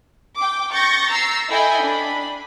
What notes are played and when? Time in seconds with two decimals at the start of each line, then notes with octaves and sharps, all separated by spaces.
0.36 G5 D6
0.72 C#6 G6 A6 A#6
1.09 A#5 E6 C7
1.48 E4 A4 D#5 G5 G#5 B5
1.83 D4 B5